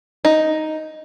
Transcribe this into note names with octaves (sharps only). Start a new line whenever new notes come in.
D#4